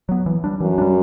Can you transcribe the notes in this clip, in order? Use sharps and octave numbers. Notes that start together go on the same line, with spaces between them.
F#3 B3
E3
G3 D4
F#2 E3
G3 D4